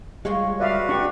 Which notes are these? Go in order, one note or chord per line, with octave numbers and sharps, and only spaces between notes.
G3 G#3 F4 C#5 F#5
F#4 B4 D5 E5 F5
D4 G4 D5 C#6